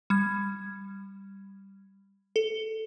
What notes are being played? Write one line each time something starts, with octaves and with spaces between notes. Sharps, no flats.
G3 G#6
A4